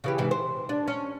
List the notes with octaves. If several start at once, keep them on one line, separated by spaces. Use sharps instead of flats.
C#3 E3 G4
G#2 C3 E3
C5
D4
C#4